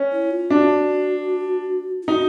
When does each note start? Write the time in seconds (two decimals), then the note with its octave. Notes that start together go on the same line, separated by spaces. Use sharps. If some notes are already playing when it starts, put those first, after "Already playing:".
Already playing: C#4
0.12 E4
0.31 F4
0.50 D4 F#4
2.03 F4
2.07 D#4 F#4